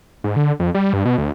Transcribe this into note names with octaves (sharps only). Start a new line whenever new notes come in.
G#2
D3
F2
G3
G2
B2
D2